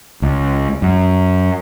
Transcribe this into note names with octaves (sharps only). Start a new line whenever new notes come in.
C#2
F#2